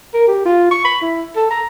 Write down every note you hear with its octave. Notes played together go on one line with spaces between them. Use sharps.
A#4
G4
F4
C#6
B5
E4
A4
A#5